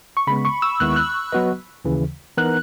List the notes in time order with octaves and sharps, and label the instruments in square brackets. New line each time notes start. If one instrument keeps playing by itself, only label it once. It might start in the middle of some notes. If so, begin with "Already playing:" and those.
[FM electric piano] C#6
[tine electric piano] C#3 G#3 B3 [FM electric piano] B5
[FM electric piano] C#6
E6
[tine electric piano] D#2 D#3 G#3 B3 E4 [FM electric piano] F#6
[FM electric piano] F#6
[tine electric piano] F#3 B3 F#4 B4 D#5
D#2 C#3 E3
[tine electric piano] E3 B3 D#4 A#4 [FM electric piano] F#6